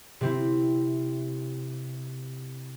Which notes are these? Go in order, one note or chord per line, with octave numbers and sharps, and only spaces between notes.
C3 C4 E4